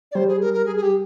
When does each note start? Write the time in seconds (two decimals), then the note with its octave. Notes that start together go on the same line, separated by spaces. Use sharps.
0.12 D5
0.15 G3 C5
0.28 G#4
0.41 A#4
0.53 A#4
0.66 G#4
0.76 G#4
0.82 G4